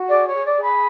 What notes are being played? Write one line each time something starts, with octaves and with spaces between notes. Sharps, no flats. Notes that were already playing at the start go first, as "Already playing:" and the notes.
Already playing: F#4
G#4 D5
C#5
G#4
D5
G#4
B5